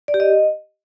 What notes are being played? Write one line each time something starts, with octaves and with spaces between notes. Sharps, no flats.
D5
G4
D#5